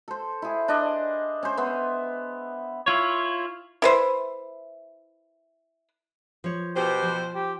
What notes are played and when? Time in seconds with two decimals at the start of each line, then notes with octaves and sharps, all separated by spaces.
0.08 A4 C5
0.42 E4 G#4
0.68 D4 D#5
1.43 C#4 C5
1.57 B3 E5 C6
2.86 E4 F4 C#5
3.82 E4 B4 C5
6.44 F3 C#5
6.76 B2 G4 C5
7.02 F3
7.35 G4